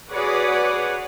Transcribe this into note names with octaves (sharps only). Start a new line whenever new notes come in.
F#4 G#4 B4 C#5 D5 F#5